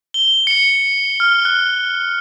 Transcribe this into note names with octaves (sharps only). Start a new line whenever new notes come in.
G7
C#7
F6
F#6